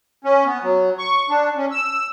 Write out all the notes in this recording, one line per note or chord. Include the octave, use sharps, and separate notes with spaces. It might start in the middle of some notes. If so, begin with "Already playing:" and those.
C#4
B3
F#3
C#6
D4
C#4
E6